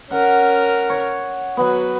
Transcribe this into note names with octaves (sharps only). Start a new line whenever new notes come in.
C#4 A#4 F#5
C#5
F#3 B3 F#4 B4